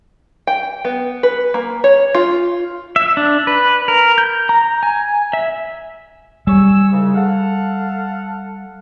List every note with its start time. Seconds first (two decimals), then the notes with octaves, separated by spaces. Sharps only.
0.47 G5
0.85 B3
1.23 B4
1.54 A#3
1.84 C#5
2.15 F4
2.96 E5
3.17 D4
3.47 B4
3.88 A#4
4.18 G6
4.49 A#5
4.83 G#5
5.33 E5
6.47 G3 G#5 C#6 E6
6.91 C2 G#2 C#3
7.15 A4 F5 F#5